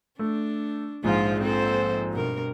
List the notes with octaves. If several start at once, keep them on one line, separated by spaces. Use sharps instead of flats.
A3 D4
A#1 G#2 F3 F4 G#4
C4 A4 C5
G2 B2 A#4